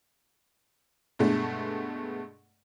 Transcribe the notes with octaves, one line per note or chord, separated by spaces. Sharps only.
G2 B2 G#3 A3